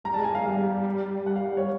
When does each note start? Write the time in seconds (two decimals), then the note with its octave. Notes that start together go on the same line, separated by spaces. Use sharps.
0.04 G3 A#5
0.14 A5
0.18 G#3
0.24 G#5
0.31 G3 F5
0.46 G3 F5
1.26 F#5
1.36 F5
1.57 C#5